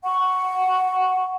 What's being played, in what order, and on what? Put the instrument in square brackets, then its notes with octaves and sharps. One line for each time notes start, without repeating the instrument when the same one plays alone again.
[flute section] F#5 C#6